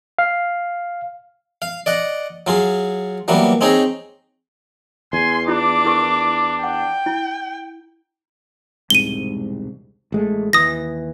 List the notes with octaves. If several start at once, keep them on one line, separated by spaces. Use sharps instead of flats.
F5
F5
D5 D#5 F#5
F#3 F4 G#4
E3 F#3 G3 A#3 B3
C4 D#4 G#4 C#5 A#5
E2 G#5 C6
D4 E4 F4 D6
E4 A#4 C#6
F#5 G5
E4
E1 C2 G#2 D#7 G7
A1 G#3 A3
D#2 E3 D#6 A#6